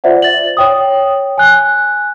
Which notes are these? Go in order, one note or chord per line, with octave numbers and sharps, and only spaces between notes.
F4 C5 D5 E5 F#5
A6 F#7
C#5 G5 D#6
G#5 F#6